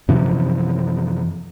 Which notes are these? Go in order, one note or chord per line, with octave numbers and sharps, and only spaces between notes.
F#2 C3 E3 F3